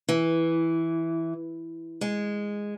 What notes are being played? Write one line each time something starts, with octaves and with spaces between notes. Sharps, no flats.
E3
G#3